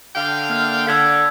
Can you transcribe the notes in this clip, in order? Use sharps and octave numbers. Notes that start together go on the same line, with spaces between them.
D3 F5 G5
A#3 F6
D3 E6 G#6 B6